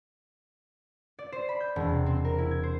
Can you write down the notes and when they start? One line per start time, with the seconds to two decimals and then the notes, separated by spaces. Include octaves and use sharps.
1.19 D5
1.32 C5
1.49 B5
1.60 G6
1.76 E1
1.89 C3
2.06 C4
2.25 A#4
2.38 E4
2.51 G#6
2.63 C5